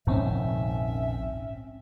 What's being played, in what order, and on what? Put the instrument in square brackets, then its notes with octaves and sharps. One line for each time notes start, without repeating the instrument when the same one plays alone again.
[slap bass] F1 A#1 D#3 [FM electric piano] G#2 C4 C#4 [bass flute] E5